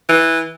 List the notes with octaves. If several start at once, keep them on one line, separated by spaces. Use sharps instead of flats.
E3